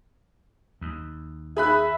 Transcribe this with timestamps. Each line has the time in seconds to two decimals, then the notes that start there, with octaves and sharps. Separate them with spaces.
0.81 D#2
1.57 G#4 E5 B5 F#6